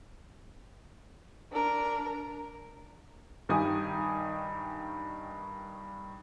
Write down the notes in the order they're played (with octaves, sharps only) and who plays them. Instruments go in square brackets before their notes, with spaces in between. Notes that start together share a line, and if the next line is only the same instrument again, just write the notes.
[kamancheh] D4 A#4
[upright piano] G2 D#3 D#4 G4 G#5 D#6